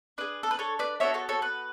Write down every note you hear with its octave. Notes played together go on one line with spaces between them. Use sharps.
D4 G#4 B4
A4
B4
A4 C#5
B4 D5
B3 D4 F#4 A4 C#5 E5
A4 C#5
A4 C#5
B4